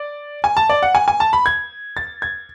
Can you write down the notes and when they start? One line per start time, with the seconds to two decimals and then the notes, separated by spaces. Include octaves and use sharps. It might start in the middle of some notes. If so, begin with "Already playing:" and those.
Already playing: D5
0.44 G#5
0.57 A5
0.70 D5
0.83 F#5
0.95 G#5
1.08 G#5
1.20 A5
1.33 B5
1.46 G#6
1.97 A6
2.22 G#6